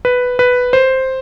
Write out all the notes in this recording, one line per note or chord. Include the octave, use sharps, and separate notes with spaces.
B4
B4
C5